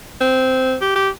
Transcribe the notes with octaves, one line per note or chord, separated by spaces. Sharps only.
C4
G4
G4